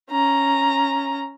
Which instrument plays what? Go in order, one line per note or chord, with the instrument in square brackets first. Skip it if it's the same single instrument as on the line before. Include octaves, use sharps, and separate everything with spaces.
[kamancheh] C#4 A#5